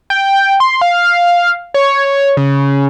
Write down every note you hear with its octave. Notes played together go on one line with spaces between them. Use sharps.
G5
C6
F5
C#5
C#3